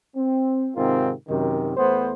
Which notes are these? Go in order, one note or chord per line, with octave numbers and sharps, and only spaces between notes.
C4
G#2 C3 D#3 C4 F4 A#4
F#2 C3 D#3
E2 A3 B3 C5